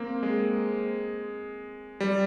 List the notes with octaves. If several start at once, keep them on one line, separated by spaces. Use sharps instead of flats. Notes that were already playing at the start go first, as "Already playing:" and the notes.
Already playing: A#3 C4
G#3
G3